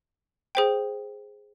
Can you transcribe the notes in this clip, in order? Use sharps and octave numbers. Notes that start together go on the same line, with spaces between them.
G#4 C5 G5